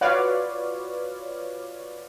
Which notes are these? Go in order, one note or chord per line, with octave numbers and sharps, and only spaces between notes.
F4 F#4 B4 C#5 D5 F5